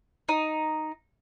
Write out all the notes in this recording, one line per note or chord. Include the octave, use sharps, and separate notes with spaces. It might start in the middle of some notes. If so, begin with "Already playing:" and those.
D#4